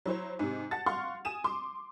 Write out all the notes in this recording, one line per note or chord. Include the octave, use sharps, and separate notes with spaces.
F#3 E4 C5 C#5
G#2 C3
F#5 A5 A6
F5 F#5 C6 C#6 F6
G#5 D#6 D#7 E7
C6 D6